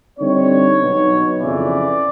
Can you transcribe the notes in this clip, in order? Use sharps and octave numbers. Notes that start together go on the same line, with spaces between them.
D3 G3 C4 D#4 C#5
B2 F#3 B3 D#4
F2 C#3 E3 D5